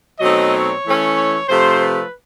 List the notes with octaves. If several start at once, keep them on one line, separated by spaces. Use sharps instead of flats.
B2 F#3 A3 C4 D#4 D#5
C#5
E3 A3 C#4
C3 F3 A3 C5
B4